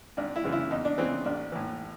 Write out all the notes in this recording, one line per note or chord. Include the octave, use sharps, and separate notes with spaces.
G#1 D4
E4
F#2 C#3 E3
E4
E2 D#4
D4
C#3 E3 C4
A1 D4
A2 E3